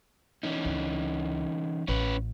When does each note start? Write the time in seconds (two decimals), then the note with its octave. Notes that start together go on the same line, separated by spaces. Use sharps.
0.43 E3 C#4 D#4
0.65 C#2
1.88 A1 C#4 B4